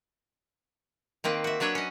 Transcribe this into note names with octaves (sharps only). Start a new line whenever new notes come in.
D#3 A#3 C4 B4
F#4 E5
F#3 D4 B4 C#5 E5
C#4 D#5